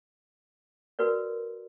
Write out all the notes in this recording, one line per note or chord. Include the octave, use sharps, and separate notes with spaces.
F#4 A#4 B4 D5